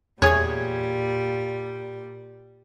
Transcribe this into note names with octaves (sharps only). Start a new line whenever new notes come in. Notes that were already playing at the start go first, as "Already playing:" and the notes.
E2 A#2 G3 G#4 C#5 G#6